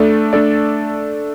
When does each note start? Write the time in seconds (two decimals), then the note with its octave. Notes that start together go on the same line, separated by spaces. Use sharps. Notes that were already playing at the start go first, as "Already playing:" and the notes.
Already playing: A3 D4 A4 D5
0.33 A3 D4 A4 D5